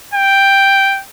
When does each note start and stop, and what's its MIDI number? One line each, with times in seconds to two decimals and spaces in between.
0.14 1.02 79